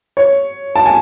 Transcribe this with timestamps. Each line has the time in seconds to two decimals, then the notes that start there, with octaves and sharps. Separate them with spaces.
0.17 C#5
0.76 A5
0.86 G#5